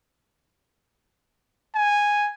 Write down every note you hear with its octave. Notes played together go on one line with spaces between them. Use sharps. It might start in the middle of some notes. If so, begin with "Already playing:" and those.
G#5